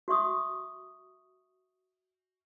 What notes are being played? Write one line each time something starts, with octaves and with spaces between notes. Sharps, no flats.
F#4 E5 C#6 D#6